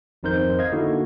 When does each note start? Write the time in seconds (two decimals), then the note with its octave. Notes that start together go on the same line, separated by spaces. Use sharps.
0.23 G#1 F2 D#4 A#4 C5 G6
0.59 D#5 F5 G#6
0.72 D3 A#3 D#4 E4 F#4